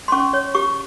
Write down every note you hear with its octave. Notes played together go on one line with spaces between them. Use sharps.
C6
C#4 C#6
C#5
G4 C#6